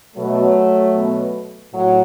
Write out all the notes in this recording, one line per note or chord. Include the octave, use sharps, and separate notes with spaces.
B2 F#3 A3
B2
A2 F#3